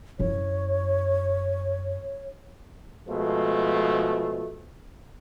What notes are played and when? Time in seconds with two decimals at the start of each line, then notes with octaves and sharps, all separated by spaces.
0.19 F#2 E4 C#5
3.08 B2 F3 G#3 A3